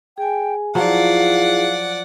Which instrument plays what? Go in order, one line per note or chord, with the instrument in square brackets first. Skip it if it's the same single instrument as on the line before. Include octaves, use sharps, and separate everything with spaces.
[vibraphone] G#4 G#5 [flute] G5
[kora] F3 F#3 [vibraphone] E4 F4 G#4 [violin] D5 F#5 [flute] F5